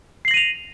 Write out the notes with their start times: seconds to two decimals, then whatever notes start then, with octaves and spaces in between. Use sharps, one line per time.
0.25 C7
0.28 F#7
0.31 A#6
0.34 D#7
0.37 F7